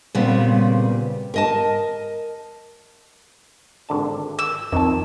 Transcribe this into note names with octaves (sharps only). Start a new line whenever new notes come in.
A#2 C#3 G3 B3 C4
A#4 D#5 A5
G#1 D3 A5
E6
F2 D#3 A5